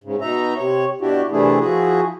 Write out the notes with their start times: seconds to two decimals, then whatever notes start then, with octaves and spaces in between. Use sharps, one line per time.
0.04 G#2 C#3
0.21 B2 D#4 E5 A#5
0.57 C3 C#5
1.01 B2 D4 E4 F#4 G4
1.31 C3 E3 A3 D4 E4 G#4
1.60 F3 E4 F#4 G#4